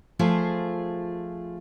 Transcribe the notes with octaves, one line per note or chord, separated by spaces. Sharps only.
F3 A3 F4 G#4 C5